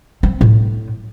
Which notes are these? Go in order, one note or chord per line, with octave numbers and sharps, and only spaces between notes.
C4
A2